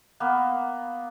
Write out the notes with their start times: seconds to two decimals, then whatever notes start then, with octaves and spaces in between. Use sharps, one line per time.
0.20 A#3 B3